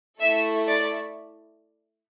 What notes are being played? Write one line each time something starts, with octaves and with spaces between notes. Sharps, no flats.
A3 E4 A4 E5
D5